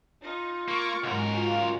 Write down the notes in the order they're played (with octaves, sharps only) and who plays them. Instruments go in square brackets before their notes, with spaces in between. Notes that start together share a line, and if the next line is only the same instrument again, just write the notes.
[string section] D#4 [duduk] F4
[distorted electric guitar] A#3 [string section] C#6 D6
[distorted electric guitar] C#2 A#4 [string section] G#2 C#4 F#4
[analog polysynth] F4